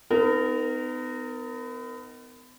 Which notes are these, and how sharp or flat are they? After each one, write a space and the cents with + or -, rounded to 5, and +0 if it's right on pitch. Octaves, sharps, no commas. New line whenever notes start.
B3 +35 D#4 +0 A#4 -20